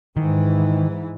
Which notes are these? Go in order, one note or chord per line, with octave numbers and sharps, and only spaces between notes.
G#2 D#3 E3